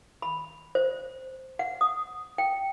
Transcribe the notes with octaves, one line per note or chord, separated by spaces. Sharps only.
B5
C5
F#5
D#6
G5